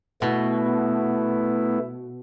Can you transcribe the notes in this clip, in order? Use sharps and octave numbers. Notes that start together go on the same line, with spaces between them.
B2 A3 B3 E4